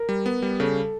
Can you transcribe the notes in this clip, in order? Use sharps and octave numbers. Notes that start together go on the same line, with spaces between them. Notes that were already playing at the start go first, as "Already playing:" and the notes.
Already playing: A#4
G3
B3
G3
C#3 A4